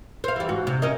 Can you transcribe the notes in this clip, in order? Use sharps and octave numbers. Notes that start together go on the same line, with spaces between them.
C5 F5
E3 G3
G#2 F#4
C3
C#4 A#4 D#5